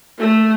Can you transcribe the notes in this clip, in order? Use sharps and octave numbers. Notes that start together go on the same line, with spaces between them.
A3